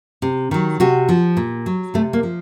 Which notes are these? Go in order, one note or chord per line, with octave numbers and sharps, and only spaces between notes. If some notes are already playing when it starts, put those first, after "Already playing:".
C3
D#3 F#3
C3 F#4
F3
A#2
F#3
C3 A3
A#3
F3